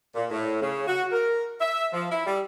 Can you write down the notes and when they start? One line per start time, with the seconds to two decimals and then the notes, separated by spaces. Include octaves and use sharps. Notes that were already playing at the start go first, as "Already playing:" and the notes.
0.15 A#2
0.30 A2
0.62 C#3
0.87 F#4
1.12 A#4
1.61 E5
1.93 F3
2.11 E4
2.26 G3